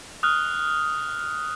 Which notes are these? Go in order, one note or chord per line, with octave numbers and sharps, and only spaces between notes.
D#6 F6 F#6